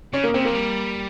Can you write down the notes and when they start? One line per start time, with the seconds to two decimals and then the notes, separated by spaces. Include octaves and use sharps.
0.14 C#3 C#4
0.24 A#3
0.34 C#3 C4
0.45 F3 A#3
0.55 G3